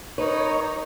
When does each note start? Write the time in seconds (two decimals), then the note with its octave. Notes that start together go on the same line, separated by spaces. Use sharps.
0.18 D#4 A#4 B4 C#5